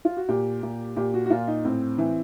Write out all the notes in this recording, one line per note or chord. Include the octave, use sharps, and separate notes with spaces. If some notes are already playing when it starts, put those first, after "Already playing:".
F4
F#4
A#2 G4
A#2
A#2 G4
F#4
F#4
A#2 F4
D#4
A2 C4
E3